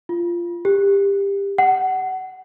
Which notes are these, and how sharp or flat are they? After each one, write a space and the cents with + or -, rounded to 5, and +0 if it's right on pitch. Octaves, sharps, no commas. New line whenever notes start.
F4 -15
G4 +20
F#5 +20